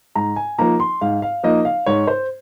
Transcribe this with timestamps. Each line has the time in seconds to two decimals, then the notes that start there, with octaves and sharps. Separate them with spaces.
0.15 G#2 A#5
0.36 G#5
0.58 F3 A#3 D#4 A#5
0.80 C6
1.01 G#2 F5
1.22 F5
1.43 F3 A#3 D#4 D#5
1.65 F5
1.86 G#2 C#5
2.07 C5